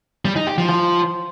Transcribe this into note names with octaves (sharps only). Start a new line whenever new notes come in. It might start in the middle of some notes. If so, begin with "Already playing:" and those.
G3
D#4
G4
F3
F3